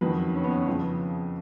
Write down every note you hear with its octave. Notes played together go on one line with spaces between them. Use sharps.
F#1 F2 D#3 F#3 B4
C#4
B3
C#4
F2 C#3 F3